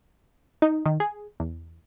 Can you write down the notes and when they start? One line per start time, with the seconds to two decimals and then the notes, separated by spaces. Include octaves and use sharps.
0.62 D#4
0.86 D#3
1.00 G#4
1.40 E2